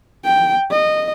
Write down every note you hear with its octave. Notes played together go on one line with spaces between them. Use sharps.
G5
D#5